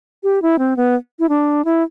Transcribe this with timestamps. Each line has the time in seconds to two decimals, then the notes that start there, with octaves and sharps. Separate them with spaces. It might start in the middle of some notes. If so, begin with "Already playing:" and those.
0.23 G4
0.42 E4
0.59 C4
0.77 B3
1.19 E4
1.29 D4
1.65 E4